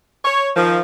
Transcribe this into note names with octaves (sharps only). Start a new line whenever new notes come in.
C#5
D#3 F3